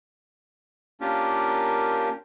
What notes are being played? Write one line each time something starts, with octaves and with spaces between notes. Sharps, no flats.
A#3 C#4 D4 F4 G4 A#4